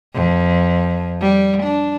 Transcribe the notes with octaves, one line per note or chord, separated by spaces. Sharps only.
F2
G3
D4